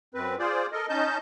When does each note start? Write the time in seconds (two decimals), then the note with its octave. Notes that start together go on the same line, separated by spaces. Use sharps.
0.14 F#2 C4 B4
0.39 F4 G#4 C5 D5
0.73 A4 A#4 D#5
0.89 C#4 D#4 D#5 A5 G6